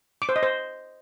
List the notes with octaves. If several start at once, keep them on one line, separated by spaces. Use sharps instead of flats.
D6
C5
D#5
C5